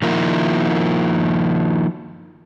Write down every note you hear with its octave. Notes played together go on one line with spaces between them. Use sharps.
D#3 F3 A#3 E4